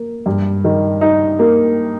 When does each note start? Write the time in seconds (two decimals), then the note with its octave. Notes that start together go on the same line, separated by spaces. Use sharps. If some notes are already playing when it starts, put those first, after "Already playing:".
Already playing: A#3
0.26 G2
0.64 D#3
1.01 D#4
1.39 A#3